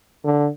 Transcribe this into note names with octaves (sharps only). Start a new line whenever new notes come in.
D3